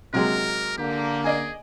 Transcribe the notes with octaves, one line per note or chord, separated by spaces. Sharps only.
C3 F#3 G#3 A#4
D3 A#3 G4
G#4 D5 D#5 G#5